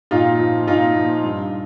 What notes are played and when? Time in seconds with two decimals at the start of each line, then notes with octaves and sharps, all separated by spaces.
0.11 A#2 D#4 F4
0.39 F3
0.67 A#2 D#4 F4
0.96 F3
1.24 G2